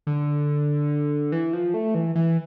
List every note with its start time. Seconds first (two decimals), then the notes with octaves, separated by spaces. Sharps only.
0.07 D3
1.32 E3
1.53 F3
1.74 A3
1.95 E3
2.15 E3